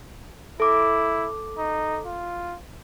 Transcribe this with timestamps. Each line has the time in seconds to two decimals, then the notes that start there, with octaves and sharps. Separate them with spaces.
0.60 E4 A4 D6
1.58 D#4
2.06 F4